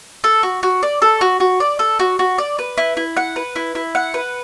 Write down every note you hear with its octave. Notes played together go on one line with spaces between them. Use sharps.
A4
F#4
F#4
D5
A4
F#4
F#4
D5
A4
F#4
F#4
D5
B4
E4
E4
F#5
B4
E4
E4
F#5
B4